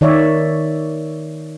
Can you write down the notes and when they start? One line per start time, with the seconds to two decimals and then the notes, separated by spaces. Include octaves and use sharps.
0.01 D#3 C#5 D5 E5